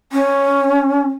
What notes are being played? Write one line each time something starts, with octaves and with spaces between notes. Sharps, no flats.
C#4